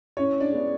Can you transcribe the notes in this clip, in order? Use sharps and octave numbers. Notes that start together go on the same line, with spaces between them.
A2 C#4 C#5
D4 D5
G#3 B3 D4